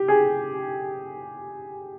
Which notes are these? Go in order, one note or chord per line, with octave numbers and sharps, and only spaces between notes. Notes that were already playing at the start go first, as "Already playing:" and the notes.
Already playing: G4
G#4